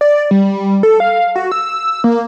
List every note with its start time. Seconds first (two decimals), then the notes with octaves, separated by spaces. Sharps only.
0.01 D5
0.31 G3
0.83 A4
1.00 F5
1.36 F#4
1.52 E6
2.04 A#3